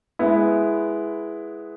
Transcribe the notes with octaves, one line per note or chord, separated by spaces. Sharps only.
G#3 B3 E4